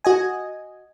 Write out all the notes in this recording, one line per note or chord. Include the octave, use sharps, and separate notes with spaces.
F#4 D#5 G#5